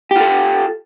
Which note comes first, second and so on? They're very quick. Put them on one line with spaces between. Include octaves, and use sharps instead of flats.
G4 F4 A4